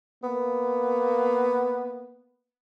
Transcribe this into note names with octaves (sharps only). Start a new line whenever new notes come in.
A#3 B3